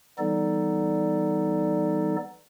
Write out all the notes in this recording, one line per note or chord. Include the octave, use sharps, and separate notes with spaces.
E3 G3 B3 D#4 A4 D5